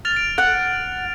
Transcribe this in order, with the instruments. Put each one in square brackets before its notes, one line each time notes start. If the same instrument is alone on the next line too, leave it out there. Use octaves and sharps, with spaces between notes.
[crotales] F6 A6 F7
A6 D7
[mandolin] F#5